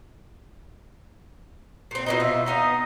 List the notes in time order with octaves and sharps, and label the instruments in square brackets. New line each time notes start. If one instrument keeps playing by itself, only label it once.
[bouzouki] A#2 C4
[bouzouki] B2 E3 D#4 [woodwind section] F4 C5 D#5
[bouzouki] F4 [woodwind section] E5
[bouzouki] B3 D#4 F5 [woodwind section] A#5 D#6